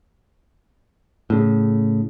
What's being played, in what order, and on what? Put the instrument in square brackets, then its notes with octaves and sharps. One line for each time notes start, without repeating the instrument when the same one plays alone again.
[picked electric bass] A2 C#3